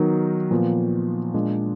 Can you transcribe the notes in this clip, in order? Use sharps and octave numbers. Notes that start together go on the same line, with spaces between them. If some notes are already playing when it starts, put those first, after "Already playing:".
Already playing: D#3 F#3 B3 D#4 A#4
A#2 F3 B3
A#2 G#3 D4